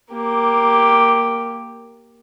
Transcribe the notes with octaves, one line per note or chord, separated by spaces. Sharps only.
A#3 G4